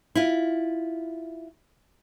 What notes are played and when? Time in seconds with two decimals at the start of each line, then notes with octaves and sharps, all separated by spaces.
0.15 E4 F4